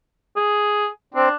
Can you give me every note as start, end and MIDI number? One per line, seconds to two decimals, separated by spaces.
0.36 0.88 68
1.14 1.29 60
1.14 1.36 62